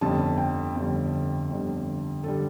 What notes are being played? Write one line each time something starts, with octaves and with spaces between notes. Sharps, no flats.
G1 F2 D3 G3 A5
G5
G1 F2 D3 G3
G1 F2 D3 G3
D3 G3 A4